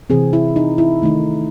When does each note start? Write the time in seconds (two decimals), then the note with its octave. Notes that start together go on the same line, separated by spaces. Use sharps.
0.10 C3 E3 C4 G#4
0.33 E4
0.56 D#4
0.78 E4
1.02 D#3 A3 D#4